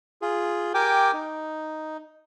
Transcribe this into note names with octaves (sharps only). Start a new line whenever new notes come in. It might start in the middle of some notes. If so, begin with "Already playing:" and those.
F4 G#4
G4 A#4 G5 G#5 D6
D#4